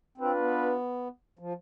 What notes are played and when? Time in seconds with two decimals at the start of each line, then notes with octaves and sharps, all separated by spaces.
0.18 C4 D4 F4 B4
0.38 B3
1.39 F3